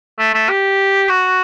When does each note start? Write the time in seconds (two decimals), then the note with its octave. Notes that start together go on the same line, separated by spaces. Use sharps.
0.19 A3
0.34 A3
0.49 G4
1.09 F#4